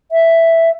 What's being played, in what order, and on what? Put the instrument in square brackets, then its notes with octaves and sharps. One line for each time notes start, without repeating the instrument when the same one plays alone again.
[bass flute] E5